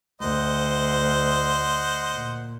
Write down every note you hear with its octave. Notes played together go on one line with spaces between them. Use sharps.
D2 C5 D#5 F#5
A#2